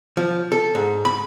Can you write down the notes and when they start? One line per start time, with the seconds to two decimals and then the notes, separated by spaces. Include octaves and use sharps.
0.17 F3
0.52 A4
0.75 G#2
1.05 B5